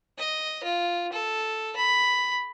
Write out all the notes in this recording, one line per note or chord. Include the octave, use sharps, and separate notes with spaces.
D#5
F4
A4
B5